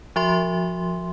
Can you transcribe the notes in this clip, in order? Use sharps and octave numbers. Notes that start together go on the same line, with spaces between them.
F3 F#4 E5 C6